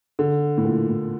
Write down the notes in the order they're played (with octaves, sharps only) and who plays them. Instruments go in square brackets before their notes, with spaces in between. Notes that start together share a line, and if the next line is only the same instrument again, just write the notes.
[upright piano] D3
A2
A#2
A2